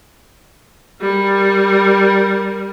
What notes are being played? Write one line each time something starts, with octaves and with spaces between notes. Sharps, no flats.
G3 A#4